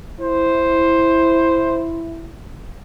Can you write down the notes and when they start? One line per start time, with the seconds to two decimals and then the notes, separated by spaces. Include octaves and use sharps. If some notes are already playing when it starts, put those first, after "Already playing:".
0.21 E4 C5